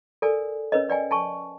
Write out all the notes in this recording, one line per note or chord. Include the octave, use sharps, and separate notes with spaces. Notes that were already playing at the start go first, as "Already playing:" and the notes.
A4 A#4 D5 G#5
C#4 A#4 B4 C#5 D#5
B4 D5 G5 G#5
G#5 A5 C#6